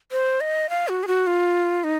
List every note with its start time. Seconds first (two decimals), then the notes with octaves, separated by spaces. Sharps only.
0.12 C5
0.41 D#5
0.70 F5
0.88 F#4
1.03 G#4
1.07 F#4
1.27 F4
1.84 D#4